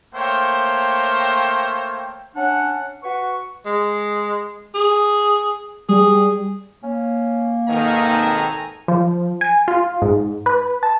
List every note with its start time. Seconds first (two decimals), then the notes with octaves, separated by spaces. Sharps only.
0.15 A3 A#3 C5 C#5 G5
2.35 C#4 D4 F#5
3.03 F#4 B4 C#6
3.66 G#3
4.75 G#4
5.89 G3 G#4
6.83 A#3 C#4
7.68 G#1 B2 D#3 A4 G#5 A#5
8.88 F3
9.41 G#5
9.68 F4
10.02 G#2
10.46 B4
10.83 A5